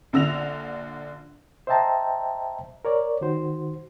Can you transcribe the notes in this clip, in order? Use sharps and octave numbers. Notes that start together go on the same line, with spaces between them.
A#1 D3 E6 A#6 F7
C5 D#5 E5 G5 A5 A#5
A#4 C#5 D5
D#3 F#4 C5